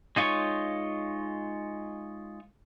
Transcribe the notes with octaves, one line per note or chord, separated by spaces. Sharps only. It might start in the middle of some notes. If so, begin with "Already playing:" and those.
G#3 D#4 F4 C#5 C#6